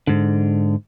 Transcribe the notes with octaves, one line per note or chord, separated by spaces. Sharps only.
G#2 D3